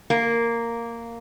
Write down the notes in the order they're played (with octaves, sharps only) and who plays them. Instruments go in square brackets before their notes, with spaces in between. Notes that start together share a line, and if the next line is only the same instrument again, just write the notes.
[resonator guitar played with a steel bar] A#3